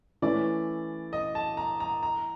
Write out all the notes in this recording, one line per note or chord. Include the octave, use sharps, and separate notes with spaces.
E3 A3 C#4 E4 D5
D#5
A5
A#5
A#5
A#5